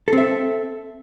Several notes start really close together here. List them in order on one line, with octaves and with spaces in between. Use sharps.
A4 C4 E5